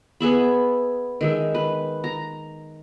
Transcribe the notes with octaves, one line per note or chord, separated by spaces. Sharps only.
B3 G#4 E5 B5
D#3 G#3 E5
B4
A#5